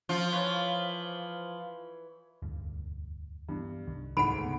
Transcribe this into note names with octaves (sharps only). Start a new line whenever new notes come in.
F3 F4
E3 B4 C#5
E1 D2 G2
G2 E3 B3
C2 D#3
D2 G#2 F#5 B5 D7
C#3 B3